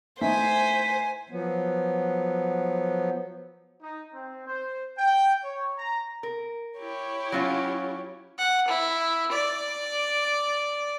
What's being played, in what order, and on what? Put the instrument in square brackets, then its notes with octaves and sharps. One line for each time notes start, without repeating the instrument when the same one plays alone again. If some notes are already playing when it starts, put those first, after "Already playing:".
[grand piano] A3 D#4 E4 [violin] C5 [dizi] G#5 [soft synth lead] B6
[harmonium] F3 F#3 B3
[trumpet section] D#4
C4
C5
G5
C#5
A#5
[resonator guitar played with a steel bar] A#4
[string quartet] E4 G4 C#5
[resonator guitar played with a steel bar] F#3 C#4 F4
[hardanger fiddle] F#5
E4
D5